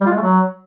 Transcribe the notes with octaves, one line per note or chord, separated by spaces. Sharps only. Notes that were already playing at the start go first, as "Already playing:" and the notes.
G3
F4
G#3
A3
F#3